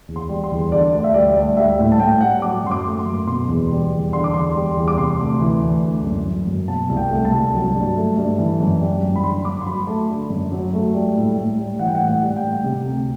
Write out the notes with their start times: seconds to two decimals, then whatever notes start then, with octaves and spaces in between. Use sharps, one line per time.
0.08 E2
0.16 C6
0.29 G3
0.44 C6
0.51 E2
0.72 D3 D5
0.93 D2
1.04 E5
1.14 G3 D5
1.36 D2
1.57 G3 E5
1.79 A2
1.92 A5
2.00 A2 G5
2.21 G3 F#5
2.42 F#3 D6
2.64 F#2 C6
2.71 D6
2.86 A3
2.99 C6
3.07 F#2
3.27 B2 C6
3.49 E2
3.70 G3
3.91 E2
4.12 D3 C6
4.24 D6
4.34 E2 C6
4.55 G3
4.77 E2
4.88 D6
4.98 C3 C6
5.20 D2
5.40 E3
5.61 D2
5.83 D3
6.04 F#2
6.26 F#3
6.47 F#2
6.68 B2 A5
6.89 C2
6.97 G5
7.11 A3
7.25 A5
7.32 C2
7.54 F#3
7.75 G2
7.96 A3
8.17 G2
8.38 E3
8.60 F#2
8.81 G3
9.03 F#2
9.16 B5
9.23 D3 C6
9.45 G2 D6
9.61 C6
9.66 F#3 B5
9.87 A3 A5
10.09 D3
10.30 F#2
10.52 F#3
10.73 A3
10.94 G3
11.15 A2
11.37 A2
11.58 G3
11.79 E3 F#5
11.87 G5
11.95 F#5
12.01 A2
12.08 F#5
12.22 G3
12.36 G5
12.43 A2
12.64 C3
12.86 D2